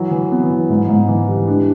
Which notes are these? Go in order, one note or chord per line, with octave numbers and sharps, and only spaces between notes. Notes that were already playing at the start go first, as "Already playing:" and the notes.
Already playing: E3 F#3
E3
B3
E3
G#2
G#2
E3
G3
D4